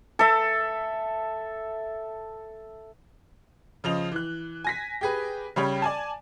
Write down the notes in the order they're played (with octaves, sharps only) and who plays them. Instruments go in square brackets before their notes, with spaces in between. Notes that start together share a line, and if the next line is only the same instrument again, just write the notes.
[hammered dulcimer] A4 E5
[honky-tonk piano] C#3 F3 D#5 F7
E3 F#6
G#5 A#6 B6
G4 G#4 B4
C#3 G3 G4 C#5 G5 B5
D5 G#5 A5